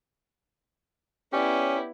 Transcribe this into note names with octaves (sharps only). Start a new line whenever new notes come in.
B3 C#4 E4 G4 C#5 D5